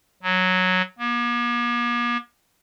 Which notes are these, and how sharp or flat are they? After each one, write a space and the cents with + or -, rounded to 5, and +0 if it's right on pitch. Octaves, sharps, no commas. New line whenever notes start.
F#3 -5
A#3 +45